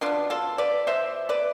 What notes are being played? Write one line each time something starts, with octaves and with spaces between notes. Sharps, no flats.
B2 B3 D4 F4
F4 A4
B4 D5
B2 B3 C5 E5
B4 D5